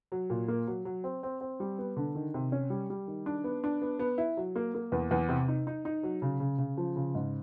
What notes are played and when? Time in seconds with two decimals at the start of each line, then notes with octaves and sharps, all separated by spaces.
0.12 F#3
0.30 A#2
0.48 A#3
0.68 F#3
0.85 F#3
1.04 C4
1.23 C4
1.41 C4
1.60 G3
1.78 B3
1.97 D3
2.15 D#3
2.34 C3
2.52 C#4
2.70 G3
2.90 G3
3.08 D#3
3.26 D4
3.44 B3
3.64 D4
3.82 B3
3.99 B3
4.18 E4
4.37 F#3
4.56 A#3
4.75 A#3
4.92 E2
5.11 E2
5.29 C3
5.48 D#4
5.67 D#4
5.85 D#4
6.03 F#3
6.22 C#3
6.40 C#3
6.58 C#3
6.77 F3
6.96 C#3
7.15 G#2